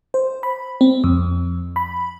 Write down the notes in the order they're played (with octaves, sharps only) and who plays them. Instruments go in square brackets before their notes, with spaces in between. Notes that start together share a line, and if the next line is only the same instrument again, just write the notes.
[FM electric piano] C5
B5
C4
F2
B5